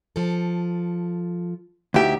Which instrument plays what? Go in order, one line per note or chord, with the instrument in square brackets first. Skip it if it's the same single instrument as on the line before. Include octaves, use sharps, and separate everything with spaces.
[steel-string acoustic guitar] F3 A4
[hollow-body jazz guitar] D2 G4 [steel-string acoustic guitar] D#4 E4 E5